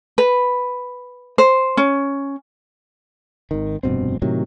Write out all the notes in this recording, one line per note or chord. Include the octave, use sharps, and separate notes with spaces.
B4
C5
C#4
G#1 D#3
F1 G2 B2 C4
A2 C3 D#3 F#3